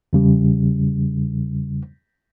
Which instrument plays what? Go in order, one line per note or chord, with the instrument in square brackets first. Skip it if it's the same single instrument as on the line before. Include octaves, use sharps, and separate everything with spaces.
[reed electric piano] E2 C#3 G3